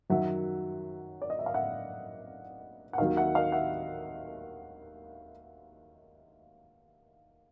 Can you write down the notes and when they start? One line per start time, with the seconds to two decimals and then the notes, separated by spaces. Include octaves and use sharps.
0.10 F#2 D#3 F#3 E5 F#5
1.22 D5
1.30 D#5
1.39 E5
1.46 F5
1.54 E5 F#5
2.93 F#5
2.98 D#2 D#3 F#3 D#5 F5
3.17 E5 F#5
3.35 D#5 F5
3.52 E5 F#5